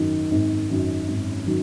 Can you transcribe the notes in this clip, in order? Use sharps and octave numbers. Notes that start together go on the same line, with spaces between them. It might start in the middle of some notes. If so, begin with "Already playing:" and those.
Already playing: G#1 F#2 D#3 F#3
G#1
F#2 D#3 F#3
G#1
D#3 F#3